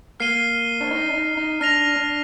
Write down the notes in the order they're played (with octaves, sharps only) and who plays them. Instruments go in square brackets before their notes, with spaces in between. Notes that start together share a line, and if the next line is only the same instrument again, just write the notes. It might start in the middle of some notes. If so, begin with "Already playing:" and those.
[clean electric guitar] A#3 [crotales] F6 C7 D#7 G7
[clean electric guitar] D4
D#4
D4
D#4
D#4
[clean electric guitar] D4 [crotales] F6 A#6 F7
[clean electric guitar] D4